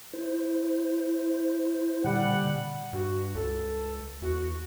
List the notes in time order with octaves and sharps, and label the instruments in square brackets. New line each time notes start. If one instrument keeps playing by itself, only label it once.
[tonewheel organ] E4 C5
[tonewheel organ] A#2 D3 [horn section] G3 F#5
[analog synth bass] G2 [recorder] F#4
[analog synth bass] C#2 [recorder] A4
[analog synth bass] E2 [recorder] F#4